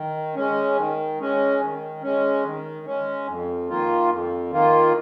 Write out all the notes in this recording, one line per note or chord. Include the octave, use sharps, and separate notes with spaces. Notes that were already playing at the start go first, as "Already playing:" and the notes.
Already playing: D#3
G#3 C#4
D#3
G#3 C#4
D#3
G#3 C#4
D#3
G#3 C#4
F2
D#3 A#3 F4
F2
D#3 A#3 F4